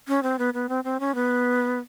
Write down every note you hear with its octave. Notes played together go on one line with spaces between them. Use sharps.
C#4
C4
B3
B3
C4
C4
C#4
B3